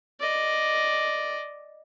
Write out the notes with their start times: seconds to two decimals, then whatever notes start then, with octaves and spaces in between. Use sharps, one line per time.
0.20 D5 D#5